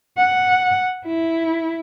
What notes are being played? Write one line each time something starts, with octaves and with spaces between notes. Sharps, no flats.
F#5
E4